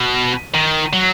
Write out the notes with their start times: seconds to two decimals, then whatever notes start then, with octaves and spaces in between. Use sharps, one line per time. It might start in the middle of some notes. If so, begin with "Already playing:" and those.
Already playing: B2
0.54 D#3
0.93 F#3